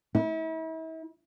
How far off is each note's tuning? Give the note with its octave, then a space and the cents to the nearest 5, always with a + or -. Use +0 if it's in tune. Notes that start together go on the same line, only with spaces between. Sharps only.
E4 -40